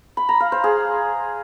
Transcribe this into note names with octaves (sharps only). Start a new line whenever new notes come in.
B5
A#5
F5
C5
G#4